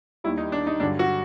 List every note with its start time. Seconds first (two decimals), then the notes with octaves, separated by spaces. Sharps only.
0.24 D#2 D#3 G3 E4
0.38 D#4
0.52 D4
0.67 D#4
0.80 G2 D3 F#3 D4
0.99 F#4